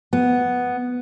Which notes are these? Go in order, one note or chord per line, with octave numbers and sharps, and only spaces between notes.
B3